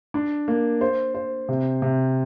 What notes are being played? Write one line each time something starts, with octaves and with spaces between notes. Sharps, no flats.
D4
A#3
C5
C5
C3
C3